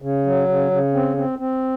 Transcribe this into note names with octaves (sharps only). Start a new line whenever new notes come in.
C#3
F#3
C#3
C#3
C4
C4
C4